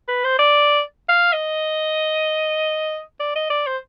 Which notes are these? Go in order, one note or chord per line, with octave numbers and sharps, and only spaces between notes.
B4
C5
D5
F5
D#5
D5
D#5
D5
C5